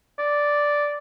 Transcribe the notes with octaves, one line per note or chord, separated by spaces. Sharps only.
D5